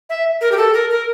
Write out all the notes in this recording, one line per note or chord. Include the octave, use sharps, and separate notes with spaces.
E5
A#4
G4
A4
A#4
A#4